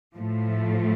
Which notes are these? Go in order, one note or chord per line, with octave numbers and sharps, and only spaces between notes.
A2 F3 A3